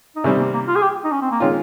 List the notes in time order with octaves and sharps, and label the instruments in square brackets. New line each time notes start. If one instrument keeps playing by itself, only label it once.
[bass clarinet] D#4
[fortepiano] C3 D#3 G3 C4 [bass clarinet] C#4
[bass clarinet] A#3
A#3
F4
G#4
G4
D#4
C#4
C4
A#3
[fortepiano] D#3 G#3 C#4 F4 [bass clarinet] C4